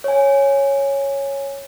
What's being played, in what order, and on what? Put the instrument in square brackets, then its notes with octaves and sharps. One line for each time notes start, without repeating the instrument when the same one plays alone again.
[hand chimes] C#5 G#5